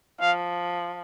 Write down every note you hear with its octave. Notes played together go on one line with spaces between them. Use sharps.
F3 F5